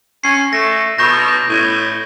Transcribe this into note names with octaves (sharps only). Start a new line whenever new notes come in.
C#4 C7
A3 A#6
B2 C#6 G6 A#6
G6
A2